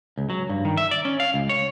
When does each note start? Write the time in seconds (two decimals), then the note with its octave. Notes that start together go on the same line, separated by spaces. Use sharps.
0.18 C#2
0.30 F#3
0.49 G2
0.65 D#3
0.77 E5
0.91 D5
1.05 C#4
1.20 F5
1.34 C#2
1.49 C#5